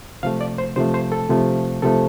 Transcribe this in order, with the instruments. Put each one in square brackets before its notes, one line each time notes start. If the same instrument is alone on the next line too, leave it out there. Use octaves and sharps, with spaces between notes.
[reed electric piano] C3 F3 A3 F5
D5
C5
C3 F3 A3 C5
C5
A4
C3 F3 A3
C3 F3 A3 A4